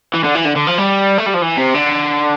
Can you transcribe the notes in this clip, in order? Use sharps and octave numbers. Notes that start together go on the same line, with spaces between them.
E3
D3
E3
D3
D3
F3
G3
A3
G3
F3
E3
C3
D3